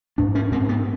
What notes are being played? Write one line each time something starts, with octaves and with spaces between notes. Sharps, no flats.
G#2 D4
C#4
G#2 C4
B3